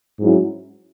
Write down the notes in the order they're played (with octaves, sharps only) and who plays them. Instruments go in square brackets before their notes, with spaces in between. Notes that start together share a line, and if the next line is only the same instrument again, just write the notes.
[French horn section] G#2 F#3 C#4 E4